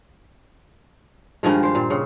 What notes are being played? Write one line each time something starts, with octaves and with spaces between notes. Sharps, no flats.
G2 D#3 F3 G#3
G4 C5
A#2
C#3